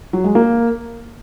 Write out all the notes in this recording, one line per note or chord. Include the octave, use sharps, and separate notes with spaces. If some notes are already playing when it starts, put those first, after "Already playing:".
F#3
G#3
A#3